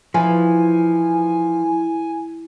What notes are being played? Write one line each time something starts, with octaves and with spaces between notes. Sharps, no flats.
E3 F3 G#5